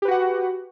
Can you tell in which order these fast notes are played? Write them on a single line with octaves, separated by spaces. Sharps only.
G4 B4 F#4 F#5